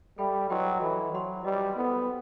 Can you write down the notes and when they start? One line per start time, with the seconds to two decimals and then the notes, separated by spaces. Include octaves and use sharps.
0.18 G3 A4 E5 G5 B5
0.49 F#3 E4 B4 D#5 G5 C6
0.81 E3 A4 D#5 F#5 B5
1.12 F#3 C5 F#5 C6
1.44 G3 F#4 B4 D#5
1.76 B3 E4 A4 C5 F#5